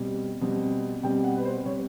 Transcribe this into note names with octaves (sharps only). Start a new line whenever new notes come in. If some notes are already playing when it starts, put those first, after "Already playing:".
Already playing: B2 G3 C4
B2 G3 C4
B2 G3 C4 G5
F#5
B4
C5
B2 G3 C4 C#5